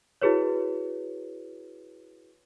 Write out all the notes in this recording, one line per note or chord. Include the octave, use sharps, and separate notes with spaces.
E4 F#4 G#4 B4 C#5